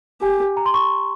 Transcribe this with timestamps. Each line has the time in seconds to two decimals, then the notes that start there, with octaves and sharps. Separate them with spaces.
0.22 G4 G#5
0.57 A#5
0.66 C6
0.74 C#6